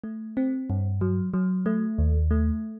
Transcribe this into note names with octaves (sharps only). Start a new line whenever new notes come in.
A3
C4
G2
F#3
F#3
A3
D#2
A3